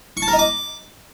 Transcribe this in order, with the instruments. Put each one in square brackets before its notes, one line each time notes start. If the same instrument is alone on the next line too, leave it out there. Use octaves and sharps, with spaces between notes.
[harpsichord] C#6
A5
A#4
D#5
D6